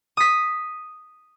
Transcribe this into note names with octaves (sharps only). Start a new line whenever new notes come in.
D#6 B6